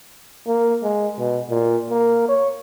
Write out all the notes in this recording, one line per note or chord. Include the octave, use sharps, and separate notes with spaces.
A#3
G#3
B2
A#2
A#3
C#5